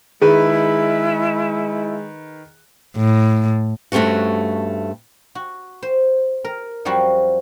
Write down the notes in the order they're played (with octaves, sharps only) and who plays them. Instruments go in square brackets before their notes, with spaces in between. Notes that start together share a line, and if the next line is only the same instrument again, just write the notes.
[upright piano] D#3 B4 [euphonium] G#3 [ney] E4 [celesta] G#4
[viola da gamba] A2
[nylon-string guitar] G2 A3 C4 C#4 F#4
[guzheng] F#4
C5
A#4
F#2 F3 G3 F#4 C5